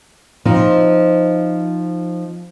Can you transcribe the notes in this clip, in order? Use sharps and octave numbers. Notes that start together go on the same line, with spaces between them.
F3 C4 D#4